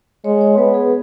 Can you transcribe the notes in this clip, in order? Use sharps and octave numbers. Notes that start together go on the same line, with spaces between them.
G#3 C#5
C#5
B3 B4
G#4